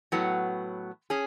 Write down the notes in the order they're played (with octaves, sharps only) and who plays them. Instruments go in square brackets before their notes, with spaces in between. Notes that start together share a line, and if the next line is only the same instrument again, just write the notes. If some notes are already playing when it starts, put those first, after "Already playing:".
[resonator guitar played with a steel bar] A2 F#3 B3
C#4 G#4